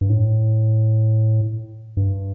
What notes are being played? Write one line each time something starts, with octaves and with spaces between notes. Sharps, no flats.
G2
A2
G2